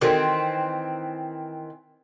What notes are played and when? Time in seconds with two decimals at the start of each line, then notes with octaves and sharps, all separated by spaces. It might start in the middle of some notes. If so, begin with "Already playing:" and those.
0.01 D#3 E3 C4 F#4 A4 A#4